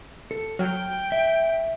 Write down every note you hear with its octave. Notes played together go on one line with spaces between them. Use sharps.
A4
F#3 G5 F6
E5